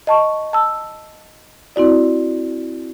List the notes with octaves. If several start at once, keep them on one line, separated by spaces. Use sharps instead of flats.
D#5 A5 C#6
A5 E6
C4 E4 F#4 D5